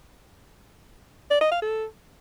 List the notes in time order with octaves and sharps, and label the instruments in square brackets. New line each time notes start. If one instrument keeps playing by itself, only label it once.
[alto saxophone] D5
D#5
F5
A4